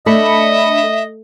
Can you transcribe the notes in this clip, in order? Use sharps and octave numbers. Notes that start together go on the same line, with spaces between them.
A3 D4 D#5 E5 B5 C#7